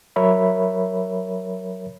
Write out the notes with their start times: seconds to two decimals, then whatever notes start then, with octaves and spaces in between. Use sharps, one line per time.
0.16 F#3 A#4 C#5 E5 B5